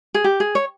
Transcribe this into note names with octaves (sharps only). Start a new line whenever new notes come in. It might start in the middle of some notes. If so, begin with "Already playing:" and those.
G#4
G4
G#4
C#5